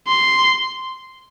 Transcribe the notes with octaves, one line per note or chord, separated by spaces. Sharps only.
C6